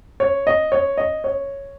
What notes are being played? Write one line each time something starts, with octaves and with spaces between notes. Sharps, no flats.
C#5
D#5
C#5
D#5
C#5